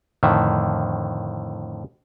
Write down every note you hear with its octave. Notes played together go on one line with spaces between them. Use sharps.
F2 A2 D3 D#3 E5